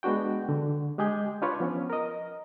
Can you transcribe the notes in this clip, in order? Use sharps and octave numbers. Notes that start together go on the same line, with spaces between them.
G#3 B3 D4 F#4 G5
D3
G#3 G4 G#4 G6
D4 F4 B4 C#5 D5
F3 B3 C#4
A#4 D#5